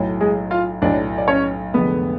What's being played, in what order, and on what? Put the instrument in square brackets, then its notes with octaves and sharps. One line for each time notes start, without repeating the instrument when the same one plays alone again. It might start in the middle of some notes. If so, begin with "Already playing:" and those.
Already playing: [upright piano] B1 A2 F#3
[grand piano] G#3 G#4
F4 F5
[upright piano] B1 A2 F#3 [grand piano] D4 D5
[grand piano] D5
C#4 C#5
[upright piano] F1 F2 D3 G#3 [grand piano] B3 B4